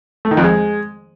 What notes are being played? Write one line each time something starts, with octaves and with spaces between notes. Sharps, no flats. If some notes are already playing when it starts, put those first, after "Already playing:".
A3
D#3
F2
G#3